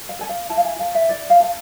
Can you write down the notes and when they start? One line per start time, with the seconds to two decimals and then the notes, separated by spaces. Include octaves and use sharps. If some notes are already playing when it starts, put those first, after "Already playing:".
0.09 F5
0.19 A4 G#5
0.29 F5
0.49 E4 A5
0.57 F5
0.65 G#5
0.79 A4 F5
0.95 E5
1.09 E4 D5
1.30 F5
1.40 A4 F5